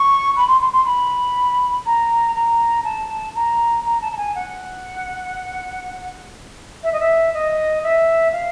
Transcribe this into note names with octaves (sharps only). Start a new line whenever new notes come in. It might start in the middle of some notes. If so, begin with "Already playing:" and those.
Already playing: C#6
B5
C6
C6
C6
B5
A#5
A#5
A5
A#5
A#5
A5
A5
G#5
F#5
E5
D#5
E5
D#5
E5
F5